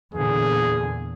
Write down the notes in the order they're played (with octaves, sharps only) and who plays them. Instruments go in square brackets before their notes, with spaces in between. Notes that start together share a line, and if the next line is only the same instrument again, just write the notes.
[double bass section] E2 A#2 D3 [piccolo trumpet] G#4